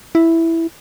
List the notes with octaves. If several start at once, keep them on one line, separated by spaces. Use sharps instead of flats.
E4